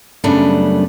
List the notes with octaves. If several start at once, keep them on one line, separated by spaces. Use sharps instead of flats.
F#2 C#3 G3 A3 B3 D4